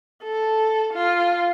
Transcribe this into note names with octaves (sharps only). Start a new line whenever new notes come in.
A4
F4